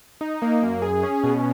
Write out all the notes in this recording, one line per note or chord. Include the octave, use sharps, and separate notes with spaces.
D#4
A#3
F#2
G#4
C#4
B2